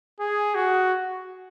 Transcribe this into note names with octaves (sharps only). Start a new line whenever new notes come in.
G#4
F#4